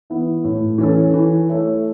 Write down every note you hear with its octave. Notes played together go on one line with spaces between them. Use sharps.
E3 B3 E4
A2
E3 C#4 A4
E3
A3 E4 C#5